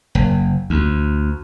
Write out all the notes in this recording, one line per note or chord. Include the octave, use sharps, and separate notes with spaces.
F#1
D2